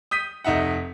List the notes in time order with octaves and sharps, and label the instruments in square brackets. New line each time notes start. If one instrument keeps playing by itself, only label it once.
[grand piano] D#6 G6 B6 D#7
F1 D#4 E5 F#5